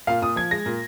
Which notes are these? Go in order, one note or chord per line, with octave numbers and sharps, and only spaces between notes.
A#2 F5
A#2 D#6
F3 G#6
G#3 A#6
A#2